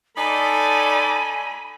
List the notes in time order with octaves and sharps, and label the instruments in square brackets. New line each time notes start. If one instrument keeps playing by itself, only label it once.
[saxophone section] D#4 D5 [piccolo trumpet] A4 [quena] G#5 [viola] B5